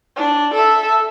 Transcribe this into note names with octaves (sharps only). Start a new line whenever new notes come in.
D4
A4 E5